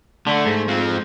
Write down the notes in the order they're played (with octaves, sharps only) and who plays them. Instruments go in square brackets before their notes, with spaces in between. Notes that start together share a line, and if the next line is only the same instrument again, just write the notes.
[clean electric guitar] D3 [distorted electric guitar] A3
[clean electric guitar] G#2
[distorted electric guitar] F3 C4